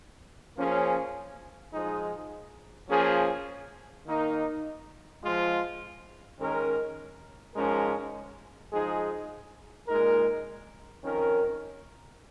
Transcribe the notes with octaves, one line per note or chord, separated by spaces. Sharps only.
F3 A#3 C#4 G#4
F3 G#3 D#4 G#4
F3 A#3 C#4 G#4
D#3 A#3 D#4 A#4
F3 G#3 F4
D#3 G#3 C#4 A#4
G#2 F3 G#3 C#4 A#4
F3 G#3 D#4 G#4
A#2 G#3 D#4 A#4
F2 D#3 C#4 A#4